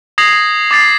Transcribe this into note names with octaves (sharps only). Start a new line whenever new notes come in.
D#6 G#6 A#6 C7 F#7
D6 A6 C7